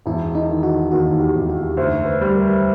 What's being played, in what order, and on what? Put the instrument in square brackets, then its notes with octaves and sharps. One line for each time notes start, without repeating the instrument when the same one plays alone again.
[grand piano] E1 [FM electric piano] E4
[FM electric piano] D#4
[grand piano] D#3
[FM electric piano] F#4
[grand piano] D#2 [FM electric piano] F#4
[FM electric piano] G4
[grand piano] E1
[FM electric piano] F#4
[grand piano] D2 [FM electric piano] C5
[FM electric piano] B4
[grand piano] G3
[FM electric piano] A#4